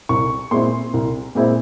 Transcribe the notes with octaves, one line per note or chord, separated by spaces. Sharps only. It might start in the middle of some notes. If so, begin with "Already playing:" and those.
C2 C#6
A#2 G#3 C4 E4 C6
C2
A#2 G#3 C4 E4